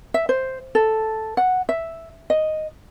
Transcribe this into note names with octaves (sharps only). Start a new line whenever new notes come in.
E5
C5
A4
F#5
E5
D#5